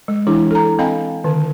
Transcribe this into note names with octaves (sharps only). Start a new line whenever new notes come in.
G#3
E3 D4 E4 G#4
A4 A#5
C4 D#5 F5 G5 B5
D3 D#3